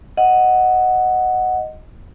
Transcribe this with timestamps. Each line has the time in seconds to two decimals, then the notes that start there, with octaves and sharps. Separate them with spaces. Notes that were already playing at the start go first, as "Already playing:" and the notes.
0.17 D#5 F#5